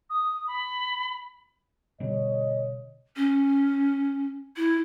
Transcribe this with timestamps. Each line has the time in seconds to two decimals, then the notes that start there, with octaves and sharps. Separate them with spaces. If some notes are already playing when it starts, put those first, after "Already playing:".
0.09 D#6
0.47 B5
2.00 B2 D3 G3 C#5 D#5
3.16 C#4
4.57 E4